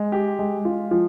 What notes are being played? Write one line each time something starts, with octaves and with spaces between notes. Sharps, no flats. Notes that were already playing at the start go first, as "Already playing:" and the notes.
Already playing: G#3
G4
G#3
F4
F3